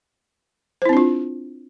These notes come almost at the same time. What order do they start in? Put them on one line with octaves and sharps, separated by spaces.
C5 E4 C4 D4 F4